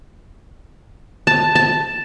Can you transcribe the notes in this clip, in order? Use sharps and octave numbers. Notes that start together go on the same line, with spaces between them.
A5
A5